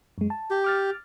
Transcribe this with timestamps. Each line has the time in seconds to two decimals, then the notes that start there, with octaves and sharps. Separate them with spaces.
0.18 F#2 G#3
0.30 A5
0.50 G4
0.64 D6 F6 A6